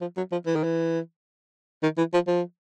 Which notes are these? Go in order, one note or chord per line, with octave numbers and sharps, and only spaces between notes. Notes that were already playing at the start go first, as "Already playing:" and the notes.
F3
F#3
F3
E3
D#3
E3
D#3
E3
F3
F3